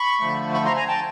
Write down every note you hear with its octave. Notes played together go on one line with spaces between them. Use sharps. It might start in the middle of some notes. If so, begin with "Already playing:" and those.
Already playing: B5 C#6
D3 F3 A3
B5 C#6
A#5 C6
G#5 A#5
G5 A5